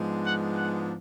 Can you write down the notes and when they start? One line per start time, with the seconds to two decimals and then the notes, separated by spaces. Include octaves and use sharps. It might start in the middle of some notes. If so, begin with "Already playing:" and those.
Already playing: G#2 F3 G#3 B3 D4
0.25 F#5
0.57 F#5